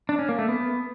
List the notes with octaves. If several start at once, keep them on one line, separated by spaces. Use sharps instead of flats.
D4
C#4
A#3
A3
B3